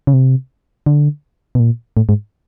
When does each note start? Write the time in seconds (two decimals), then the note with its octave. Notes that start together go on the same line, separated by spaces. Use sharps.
0.07 C#3
0.13 C3
0.86 D3
1.55 B2
1.60 A#2
1.97 A2
2.09 G#2